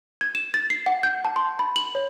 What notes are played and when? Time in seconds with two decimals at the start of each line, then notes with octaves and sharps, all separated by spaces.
0.21 G#6
0.35 E7
0.54 A6
0.70 C7
0.86 F#5
1.03 G6
1.25 A5
1.36 C6
1.59 B5
1.76 F#7
1.95 C#5